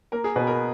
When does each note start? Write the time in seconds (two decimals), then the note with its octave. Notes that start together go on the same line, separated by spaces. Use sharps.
0.12 A#3 A#4
0.24 G#4
0.36 B2 B4
0.47 A#4